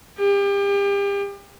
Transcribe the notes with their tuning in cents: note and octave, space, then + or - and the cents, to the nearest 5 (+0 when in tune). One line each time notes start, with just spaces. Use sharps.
G4 +35